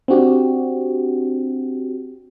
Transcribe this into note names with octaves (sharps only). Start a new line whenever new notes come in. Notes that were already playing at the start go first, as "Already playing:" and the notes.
C4 D4 F#4 G4